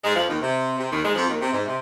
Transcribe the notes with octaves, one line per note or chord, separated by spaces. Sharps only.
G#2 G#3
F2 F3
D#2 D#3
C3
C3
D#2 D#3
G#2 G#3
F2 F3
D#2 D#3
C3
G#2
C3